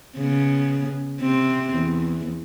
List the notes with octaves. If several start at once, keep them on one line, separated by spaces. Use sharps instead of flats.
C#3 B3
C3 C4
E2